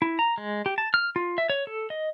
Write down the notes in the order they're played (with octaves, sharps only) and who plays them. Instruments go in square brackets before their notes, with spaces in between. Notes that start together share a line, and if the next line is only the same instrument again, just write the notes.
[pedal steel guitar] E4
A#5
G#3
G4
A5
F6
F4
E5
C#5
A4
D#5